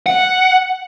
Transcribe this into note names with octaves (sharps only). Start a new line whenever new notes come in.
F#5